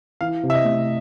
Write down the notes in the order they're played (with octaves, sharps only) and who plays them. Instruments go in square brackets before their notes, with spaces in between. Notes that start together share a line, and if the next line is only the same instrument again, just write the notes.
[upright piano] E3 [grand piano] F5
[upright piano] C3
[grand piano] E5
D#5
[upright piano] A3